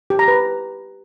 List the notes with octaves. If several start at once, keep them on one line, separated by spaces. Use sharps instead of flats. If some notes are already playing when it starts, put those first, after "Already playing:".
G4
A#5
B4